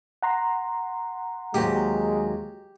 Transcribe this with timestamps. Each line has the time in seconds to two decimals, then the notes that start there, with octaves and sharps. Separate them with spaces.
0.23 F#5 A#5 C6
1.54 D#2 F#3 G#3 G4 C5